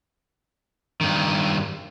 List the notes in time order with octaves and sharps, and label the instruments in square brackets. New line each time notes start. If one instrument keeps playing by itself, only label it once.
[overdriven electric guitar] G2 D#3